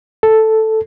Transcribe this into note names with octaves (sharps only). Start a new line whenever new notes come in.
A4